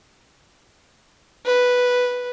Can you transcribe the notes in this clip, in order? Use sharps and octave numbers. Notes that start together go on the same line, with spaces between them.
B4